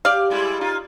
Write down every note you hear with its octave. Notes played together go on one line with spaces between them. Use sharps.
G4 D5 F5
G3 G#3 E4
D#4 F4